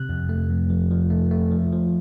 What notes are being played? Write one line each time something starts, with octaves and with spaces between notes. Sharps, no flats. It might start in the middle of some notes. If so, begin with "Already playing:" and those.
Already playing: C3 F#6
F2
A3
F2
F3
F3
A3
A3
F3
F3